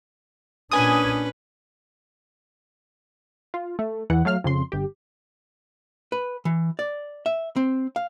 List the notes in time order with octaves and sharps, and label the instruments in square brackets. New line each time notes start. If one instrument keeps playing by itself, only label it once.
[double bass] A#2 D4 [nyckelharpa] C#4 B4 [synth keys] G#5 D#6
[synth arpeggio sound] F4
A3
E2 E3 F#5
F#3 A3 F5 F6
F2 C#3 C6
G1 G4
[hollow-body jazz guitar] B4
E3
D5
E5
C4
F5